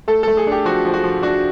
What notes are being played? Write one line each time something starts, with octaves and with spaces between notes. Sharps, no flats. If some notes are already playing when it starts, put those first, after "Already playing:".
A3 A4
A3 A4
G#4
D4 G4
F3 F#4
F3
F#4
F3
D4 F#4